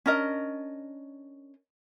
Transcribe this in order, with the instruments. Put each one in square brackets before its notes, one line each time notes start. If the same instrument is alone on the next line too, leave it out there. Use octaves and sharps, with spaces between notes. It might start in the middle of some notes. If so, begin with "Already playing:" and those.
[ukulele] C#4 D4 A#4 D#5